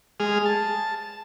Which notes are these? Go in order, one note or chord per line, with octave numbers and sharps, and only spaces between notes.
G#3 G#4 F6
A5